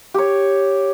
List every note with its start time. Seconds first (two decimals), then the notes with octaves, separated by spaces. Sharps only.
0.14 G4 C#5